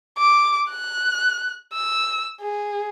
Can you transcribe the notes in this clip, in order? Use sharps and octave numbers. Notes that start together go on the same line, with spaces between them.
D6
F#6
E6
G#4